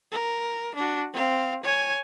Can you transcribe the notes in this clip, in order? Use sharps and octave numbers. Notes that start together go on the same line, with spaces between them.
A#4
D4 F#4
C4 F5
C#5 G#5